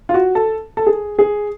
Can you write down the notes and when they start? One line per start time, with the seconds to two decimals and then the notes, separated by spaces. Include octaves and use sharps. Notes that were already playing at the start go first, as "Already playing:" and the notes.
0.09 F4
0.14 F#4
0.35 A4
0.77 A4
0.87 G#4
1.19 G#4